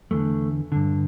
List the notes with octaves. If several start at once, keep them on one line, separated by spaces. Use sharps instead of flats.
E2 D3 A3
G2 D3